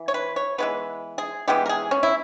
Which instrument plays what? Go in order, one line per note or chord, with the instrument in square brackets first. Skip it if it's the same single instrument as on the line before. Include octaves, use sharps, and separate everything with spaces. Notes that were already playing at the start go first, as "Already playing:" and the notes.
Already playing: [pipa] E3
C#5
B4
C#5
E3 G#3 B3 B4
G#4
E3 G#3 B3 G4
A#4
G#4
C#4
E4